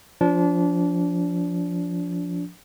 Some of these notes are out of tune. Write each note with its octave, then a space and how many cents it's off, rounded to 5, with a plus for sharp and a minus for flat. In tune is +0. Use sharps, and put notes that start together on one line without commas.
F3 +0 D4 -25